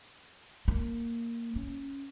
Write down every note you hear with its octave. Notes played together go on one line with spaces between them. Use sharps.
A#3
C#4